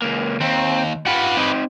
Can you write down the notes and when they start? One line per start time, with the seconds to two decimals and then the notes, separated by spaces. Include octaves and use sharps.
0.02 C#2 A#3
0.40 D#2 C4
1.07 F4 G4 B4 F#5
1.37 C4 D#4